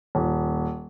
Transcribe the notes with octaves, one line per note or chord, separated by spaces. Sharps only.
D#1